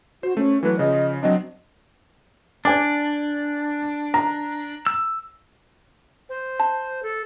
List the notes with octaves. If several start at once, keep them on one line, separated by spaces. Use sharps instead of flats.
F#4 C5
A3 C#4
E3 F#3 A3 B4
C#3 F3 D#5
F#3 C4 D4 D#5
D4 D5 G#5 D6
A#5
E6
C5
A5
A4